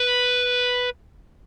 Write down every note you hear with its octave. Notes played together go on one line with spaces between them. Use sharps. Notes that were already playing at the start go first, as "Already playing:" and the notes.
Already playing: B4